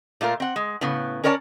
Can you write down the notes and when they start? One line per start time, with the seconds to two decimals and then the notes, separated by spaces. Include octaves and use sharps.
0.21 A#2 A3 F4 A#4
0.40 C4 F#5
0.56 G#3
0.81 A2 C#3 B3
1.24 C#4 A#4 C#5 D5 F#5 A5